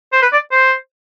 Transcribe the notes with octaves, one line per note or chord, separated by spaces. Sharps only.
C5
B4
D5
C5